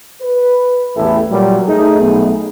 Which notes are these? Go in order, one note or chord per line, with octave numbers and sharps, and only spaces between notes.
B4
A1 E2 A3 E4 G4 A4
A#2 F#3 G3
A3 D#4 G#4
B1 B3